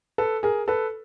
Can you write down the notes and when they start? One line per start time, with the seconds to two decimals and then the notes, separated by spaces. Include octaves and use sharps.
0.18 A4 B4
0.43 G#4 A#4
0.68 A4 B4